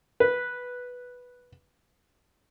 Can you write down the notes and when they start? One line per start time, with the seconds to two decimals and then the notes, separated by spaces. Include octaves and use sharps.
0.20 B4